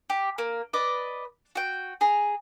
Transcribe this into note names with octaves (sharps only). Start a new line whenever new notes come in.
G4
A#3
B4 D5 D#5 D6
F#4 G5
G#4 A#5